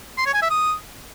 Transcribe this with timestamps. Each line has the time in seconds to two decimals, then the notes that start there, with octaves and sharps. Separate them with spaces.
0.18 C6
0.26 C#5
0.34 G#5
0.42 E5
0.50 D#6